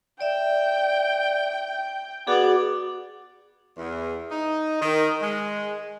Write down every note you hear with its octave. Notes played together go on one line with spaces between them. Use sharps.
D5 E5 G5
B3 F#4 G#4 D5
E2
D#4
D#3
G#3